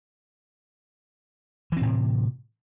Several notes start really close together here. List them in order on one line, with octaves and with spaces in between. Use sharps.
E3 C4 A2 C3